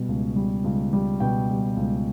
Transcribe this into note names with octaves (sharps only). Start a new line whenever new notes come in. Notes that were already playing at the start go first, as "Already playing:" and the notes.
Already playing: B2 G3
C#2
G3
C#2
G3
B2 G5
G3
C#2